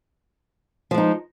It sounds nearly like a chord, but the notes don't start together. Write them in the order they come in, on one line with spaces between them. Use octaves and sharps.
F3 G#3 D#4